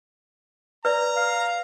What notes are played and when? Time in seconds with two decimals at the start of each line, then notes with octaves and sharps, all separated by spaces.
0.85 B4 D5 A#5
1.17 F5